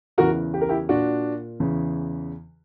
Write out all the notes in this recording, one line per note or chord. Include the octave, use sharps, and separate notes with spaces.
E2 C#3 E3 F#4 A#4
G4
A#4
E4 G4
A#2 D4 F#4
E2 C#3 E3